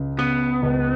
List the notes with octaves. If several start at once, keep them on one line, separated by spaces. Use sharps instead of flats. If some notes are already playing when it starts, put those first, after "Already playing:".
Already playing: C#2 C#3
C#3 B3
C#2